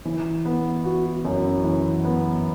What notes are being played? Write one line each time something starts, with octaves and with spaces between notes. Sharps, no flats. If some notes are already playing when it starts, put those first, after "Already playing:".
E3
B3
F#4
F#2
E3
B3